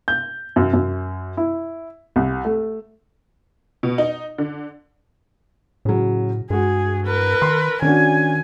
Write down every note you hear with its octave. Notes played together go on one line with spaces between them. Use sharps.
G6
F#2
F#2
E4
C2
A3
B2
D#4
D3
A2 C#3 F#3
G2 G#3 F#4 G#4
A#4 B4
D#3 C6
D#3 C#4 D4 F#4 G#5